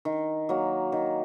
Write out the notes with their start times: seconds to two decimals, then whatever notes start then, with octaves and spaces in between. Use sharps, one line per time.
0.05 D#3
0.49 F#3 A#3
0.92 D#3